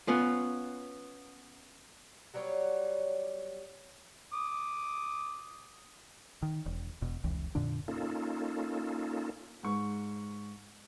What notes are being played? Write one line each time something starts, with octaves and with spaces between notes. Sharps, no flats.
B3 C#4 F4
F#3 G3 B3 C#5
D6 D#6
D#3
E1
E1 B2
F1 C#2 E3
F2 A#2 D3 D4
A#3 C#4 D#4 F4 A4
G#2 C#6